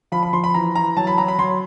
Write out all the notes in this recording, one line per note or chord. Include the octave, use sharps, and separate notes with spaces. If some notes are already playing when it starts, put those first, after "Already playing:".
F3 B5
B5
F3 C6
B5
E3 A#5
E3 A#5
F#3 A5
B5
F#3 A#5
B5
F#3 C6